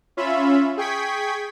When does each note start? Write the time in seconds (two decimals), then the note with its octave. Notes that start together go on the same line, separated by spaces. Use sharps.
0.17 C#4 F4 E5 B5
0.77 G#4 G5 C#6 G#6 B6